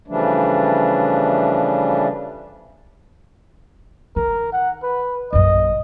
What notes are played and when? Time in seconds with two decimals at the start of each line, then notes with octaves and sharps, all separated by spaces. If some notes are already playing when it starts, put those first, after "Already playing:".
0.08 C#3 E3 F3 G3 A3 D4
4.16 D#3 A#4
4.53 F#5
4.83 B4
5.33 A#1 F#2 D#5